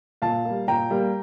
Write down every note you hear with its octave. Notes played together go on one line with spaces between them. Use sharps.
A#2 F5 A5
G3 A#3
A#2 G5 A#5
G3 A#3